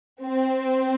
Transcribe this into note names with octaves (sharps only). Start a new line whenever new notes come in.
C4